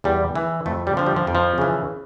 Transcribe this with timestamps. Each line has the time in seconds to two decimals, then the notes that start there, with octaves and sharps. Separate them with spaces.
0.04 E2 G3
0.35 E3
0.66 F2 A3
0.87 G3
0.97 D3 F3
1.06 G3
1.16 F3
1.27 F2
1.35 F3
1.58 C#3 E3